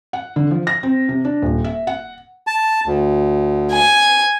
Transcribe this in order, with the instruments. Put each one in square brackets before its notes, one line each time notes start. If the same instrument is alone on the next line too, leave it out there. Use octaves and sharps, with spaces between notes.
[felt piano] F#5
D3
F3
A#6
C4
C3
D4
D#1
E5
F#5
[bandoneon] A5
D2
[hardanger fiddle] G#5